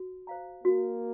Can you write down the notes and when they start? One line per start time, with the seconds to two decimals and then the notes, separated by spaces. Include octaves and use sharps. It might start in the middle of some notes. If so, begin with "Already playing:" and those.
Already playing: F#4
0.27 C5 F5 A#5
0.64 A#3 F#4